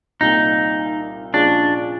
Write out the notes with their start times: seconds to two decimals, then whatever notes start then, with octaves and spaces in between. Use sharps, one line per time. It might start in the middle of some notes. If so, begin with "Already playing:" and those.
0.21 C2 A#2 G3 A#3 D#4
1.34 A#2 F3 G#3 C#4 D4